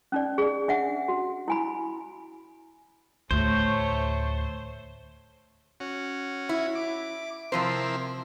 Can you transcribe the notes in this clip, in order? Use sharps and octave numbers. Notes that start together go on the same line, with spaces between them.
C#4 D#4 D5
G#4 D5
D4 E5 F#5
F#4
E4 G#5 B5
D2 A2 A3 C5 C#5
C#4 F#4
E4
D6
C3 F3 C4 E4 A#4 C5